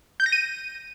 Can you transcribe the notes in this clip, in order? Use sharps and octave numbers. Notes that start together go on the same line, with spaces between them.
G6
A#6
D#7